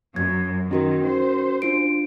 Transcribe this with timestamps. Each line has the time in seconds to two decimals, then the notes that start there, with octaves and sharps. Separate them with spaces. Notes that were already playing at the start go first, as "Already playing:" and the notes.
0.16 F#2 G#6
0.71 D#3 C#4 F#4 A#4
1.07 C5
1.62 D4 F4 D7